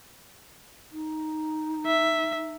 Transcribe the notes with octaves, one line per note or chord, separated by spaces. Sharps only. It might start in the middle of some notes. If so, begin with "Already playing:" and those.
D#4
E5